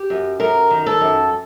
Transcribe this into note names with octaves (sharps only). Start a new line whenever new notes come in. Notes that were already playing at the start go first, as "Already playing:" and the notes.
Already playing: G4
F#2
F#2 A#4
D#3
A4
F#2